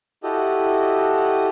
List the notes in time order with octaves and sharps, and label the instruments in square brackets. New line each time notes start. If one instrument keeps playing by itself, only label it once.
[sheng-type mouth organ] E4 F#4 G4 A4 D#5